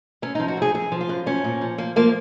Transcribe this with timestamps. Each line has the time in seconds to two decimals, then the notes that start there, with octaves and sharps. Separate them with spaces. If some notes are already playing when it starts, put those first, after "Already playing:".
0.22 F#2 C#4
0.35 D#4
0.40 F3
0.48 F#4
0.57 F#2 G#4
0.74 F#2 G#4
0.92 F3
1.01 F4
1.09 F#2
1.26 F3 C#4
1.44 A#2
1.61 F3
1.78 F3 A#3
1.96 F3 A#3